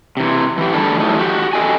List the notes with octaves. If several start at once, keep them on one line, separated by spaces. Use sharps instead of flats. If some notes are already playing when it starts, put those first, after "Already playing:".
C3 E3
E3 G4
D3 G3 A3 D4 G#4 A4
E3 F#3 G3 A3 D#4
F#4 G4
A4 D#5 G5 G#5